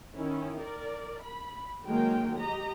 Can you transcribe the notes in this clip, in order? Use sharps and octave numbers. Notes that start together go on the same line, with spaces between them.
D#3 C#4 E4
A#4 D5
B5
D#3 F#3 G#3 A#3 A#4 G5
G4 D#5 A#5